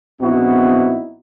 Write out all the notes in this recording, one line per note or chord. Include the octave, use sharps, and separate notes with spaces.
A#1 B3 C4 D#4 E4 F#4